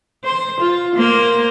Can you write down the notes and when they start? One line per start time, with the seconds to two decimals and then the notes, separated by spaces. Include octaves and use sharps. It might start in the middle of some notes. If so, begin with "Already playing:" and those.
0.24 C5
0.61 F4
0.96 A#3 C5